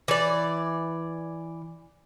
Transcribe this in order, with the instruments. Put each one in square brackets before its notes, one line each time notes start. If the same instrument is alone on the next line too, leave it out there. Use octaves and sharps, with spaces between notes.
[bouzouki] E3 D5